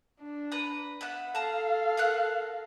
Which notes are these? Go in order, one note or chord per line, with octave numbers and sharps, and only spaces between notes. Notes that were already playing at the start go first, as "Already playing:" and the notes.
D4
B4 A#5
B3 E5 F#5 F#6
A4 F5 A5 A#5
A#4 F#5 F#6